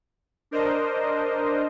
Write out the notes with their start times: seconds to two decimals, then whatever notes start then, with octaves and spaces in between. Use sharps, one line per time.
0.51 D4 A#4 C5 D#5